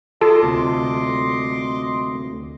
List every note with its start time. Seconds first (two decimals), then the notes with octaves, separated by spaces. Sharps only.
0.21 F4 A4 D#5 C6 D6
0.43 D2 C3